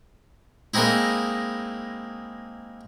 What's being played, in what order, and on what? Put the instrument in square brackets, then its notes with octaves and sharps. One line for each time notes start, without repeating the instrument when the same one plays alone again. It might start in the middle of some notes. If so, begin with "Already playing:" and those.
[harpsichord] G#3 A#3 C4 D#4 E4